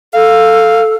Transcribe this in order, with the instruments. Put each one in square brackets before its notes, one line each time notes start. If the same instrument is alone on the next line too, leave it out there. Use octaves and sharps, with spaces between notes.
[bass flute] A4 [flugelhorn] F5